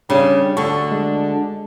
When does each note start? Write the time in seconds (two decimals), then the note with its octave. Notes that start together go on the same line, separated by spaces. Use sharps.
0.10 C#3 G3 D4
0.57 D2 D3 D4 C#6
0.92 G#3